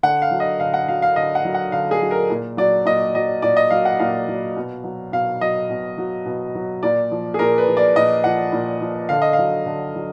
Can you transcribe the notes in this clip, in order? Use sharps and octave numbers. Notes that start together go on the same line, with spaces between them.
D3 F#5
F5
F#3
D#5
D3 F5
F#5
F#3 F5
F5
D3 D#5
F#5
F#3
F#5
D3 F5
G#4
F#3
A#4
A#2
F#3 D5
A#2 D#5
F#3 D#5
A#2 D5
D#5
F#3 F5
F#5
A#2 F5
F#3
B2
F#3
B2 F5
F#3 D#5
B2
F#3
B2
F#3
A#2 D5
F3
G#4
A#2 A#4
B4
F3
D5
A#2 D#5
F3 F#5
A#2
F3
D3 F5
D#5
F5
F#3
D3
F#3